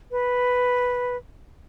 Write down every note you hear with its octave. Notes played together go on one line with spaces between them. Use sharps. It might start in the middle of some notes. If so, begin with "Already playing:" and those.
B4